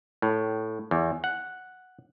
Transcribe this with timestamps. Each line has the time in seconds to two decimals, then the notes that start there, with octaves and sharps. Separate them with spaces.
0.22 A2
0.91 E2
1.24 F#5